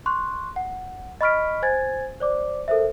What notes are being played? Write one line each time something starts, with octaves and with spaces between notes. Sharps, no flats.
C6 C#6 F#6
F#5
D#5 B5 C#6 F6 B6 D7
C5 G#5 G#6 A6
C5 D5 D6
A4 A#4 C5 E5